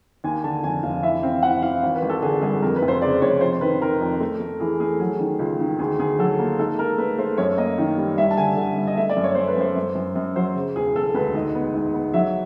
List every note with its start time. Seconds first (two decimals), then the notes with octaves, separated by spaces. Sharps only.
0.24 D#2 G#5
0.44 D3 A5
0.63 F1 G#5
0.83 F1 F5
1.03 E3 E5
1.23 C4 F5
1.43 E3 F#5
1.62 E3 F5
1.83 G#1
1.96 B4
2.02 G#1
2.09 A4
2.22 D3 G#4
2.42 G2 G#4
2.62 F2 A#4
2.76 B4
2.82 F1
2.88 C5
3.02 C#3 D5
3.22 F1 C#5
3.41 F2 C5
3.61 D#3 B4
3.81 D#3 A#4
4.01 F2
4.20 A3
4.40 A3
4.60 E3 G#4
4.80 A3 G#4
5.00 F#3 G#4
5.19 D#3
5.39 C#2
5.60 D#3
5.79 D2 G#4
5.99 D2 G#4
6.19 F#3 A4
6.39 A#3
6.59 G#2 A4
6.79 G#2 A#4
6.98 A3 B4
7.18 A3 C5
7.38 F#2 C#5
7.57 A#3 D#5
7.78 D#3
7.97 G3
8.17 G2 E5
8.31 A5
8.37 D3 G#5
8.57 D3
8.77 G2
8.87 D#5
8.97 A3 E5
9.10 D5
9.17 F#2
9.24 C#5
9.35 A3 C5
9.48 B4
9.57 F#2 C5
9.76 F#2
9.95 F#2
10.16 F#2
10.36 F#3 C5
10.56 C#3
10.76 E1 G#4
10.95 E1 A4
11.14 D2 B4
11.35 G#2 D#5
11.55 B3
11.74 G#2
11.94 B3
12.14 F#3 E5